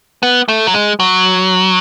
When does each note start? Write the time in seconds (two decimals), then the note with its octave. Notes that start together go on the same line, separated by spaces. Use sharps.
0.23 B3
0.48 A3
0.67 F#3
0.74 G#3
1.00 F#3